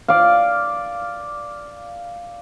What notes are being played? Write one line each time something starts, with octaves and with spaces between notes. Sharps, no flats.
D5 F5